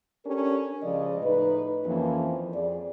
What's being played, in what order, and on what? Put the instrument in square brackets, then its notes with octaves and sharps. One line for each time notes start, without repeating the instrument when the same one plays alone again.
[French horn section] C#4 D4 G4 A4 A#4
C#3 F3 G#3 D5 D#5
A2 D#4 B4
F2 E3 F3 A#3 C#4
F2 G#4 D5